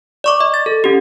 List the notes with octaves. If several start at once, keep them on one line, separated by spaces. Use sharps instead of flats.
D5 C#6 D6
D#5
A6
A4
C#4 G4